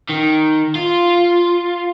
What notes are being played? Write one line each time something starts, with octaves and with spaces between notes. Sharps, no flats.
D#3
F4